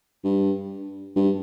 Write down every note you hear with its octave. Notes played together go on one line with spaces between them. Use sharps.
G2
G2